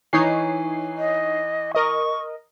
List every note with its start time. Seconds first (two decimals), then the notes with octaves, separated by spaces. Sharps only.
0.13 E3 D#4 C#5 C7
0.98 D#5
1.75 A#4 D#5 C#6